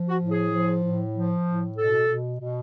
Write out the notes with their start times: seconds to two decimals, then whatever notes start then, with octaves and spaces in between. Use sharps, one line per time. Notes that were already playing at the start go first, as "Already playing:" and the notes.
Already playing: F3
0.09 F#4
0.20 A2
0.30 G#4
0.51 F3
0.82 A2
1.14 F3
1.45 A2
1.76 B2 A4
2.07 B2
2.39 B2